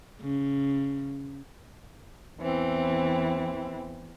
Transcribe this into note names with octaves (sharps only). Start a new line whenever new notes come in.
C#3
E2 E3 C4